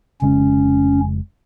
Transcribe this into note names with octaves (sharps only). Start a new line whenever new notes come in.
F1 C#3 G#3 C#4